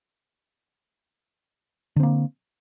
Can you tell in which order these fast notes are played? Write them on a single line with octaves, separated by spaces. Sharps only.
D3 C4 A#3